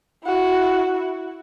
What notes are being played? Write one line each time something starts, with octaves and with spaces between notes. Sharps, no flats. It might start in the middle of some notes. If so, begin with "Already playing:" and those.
E4 F#4